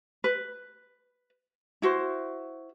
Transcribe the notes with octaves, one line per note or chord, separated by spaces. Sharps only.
B4
E4 F#4 C5